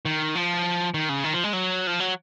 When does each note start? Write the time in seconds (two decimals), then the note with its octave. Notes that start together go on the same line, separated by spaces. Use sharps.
0.06 D#3
0.35 F3
0.94 D#3
1.09 C#3
1.24 D#3
1.33 F3
1.44 G#3
1.53 F#3
1.87 F3
2.00 F#3